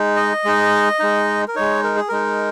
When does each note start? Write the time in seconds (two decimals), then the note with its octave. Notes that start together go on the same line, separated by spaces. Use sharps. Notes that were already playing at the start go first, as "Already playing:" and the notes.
Already playing: G#3 D#4
0.16 D#5
0.44 G#3 D#4
1.00 G#3 D#4
1.48 A#4
1.55 G#3 D#4 C#5
1.84 A#4
1.96 G#4
2.09 G#3 D#4 A#4